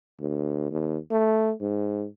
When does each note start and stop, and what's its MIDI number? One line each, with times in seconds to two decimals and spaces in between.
0.20 0.67 38
0.71 0.97 39
1.11 1.53 57
1.61 2.06 44